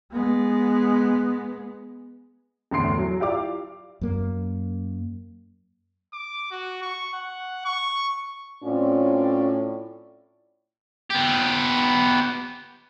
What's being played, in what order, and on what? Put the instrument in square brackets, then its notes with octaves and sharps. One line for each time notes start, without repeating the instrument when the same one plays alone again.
[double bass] G#3 B3
[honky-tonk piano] G1 E2 A2 C6 C7 D7
F#3
E4 F4 G4 D5 F5 D6
[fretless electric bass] F#2 A#3
[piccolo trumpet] D6
F#4
C#6
F#5
C#6
[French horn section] A2 C4 C#4 F4 D5
[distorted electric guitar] B3 G4